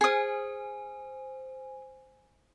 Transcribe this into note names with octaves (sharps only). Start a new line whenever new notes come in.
G#4 C5 G#5 D#6